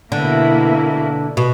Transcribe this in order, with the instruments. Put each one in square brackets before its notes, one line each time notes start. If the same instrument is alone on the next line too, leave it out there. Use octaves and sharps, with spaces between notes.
[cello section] B2 A#3 E4 [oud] D3
[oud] B2